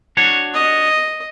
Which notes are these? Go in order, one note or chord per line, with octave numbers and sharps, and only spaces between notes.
D4 F#4 C#5
D#5